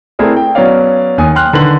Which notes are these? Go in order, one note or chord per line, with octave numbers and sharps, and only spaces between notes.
A3 C4 E4 G#4 A#4 D5
G5
F#3 B3 C#4 C#5 D5 F5
D#2 G#5 D#6
G5 C6 F6 F#6
D3 D#3 B4 C6 F#7